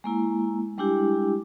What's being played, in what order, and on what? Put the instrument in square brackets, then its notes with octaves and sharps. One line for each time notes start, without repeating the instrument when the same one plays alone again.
[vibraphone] G#3 A#3 E4
G3 G#3 D4 E4 G4